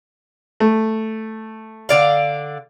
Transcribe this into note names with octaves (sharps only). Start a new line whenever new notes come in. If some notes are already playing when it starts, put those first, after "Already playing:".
A3
D3 D5 F5